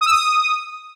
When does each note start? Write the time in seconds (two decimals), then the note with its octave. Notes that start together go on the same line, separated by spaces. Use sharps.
0.01 D#6
0.06 E6
0.11 D#6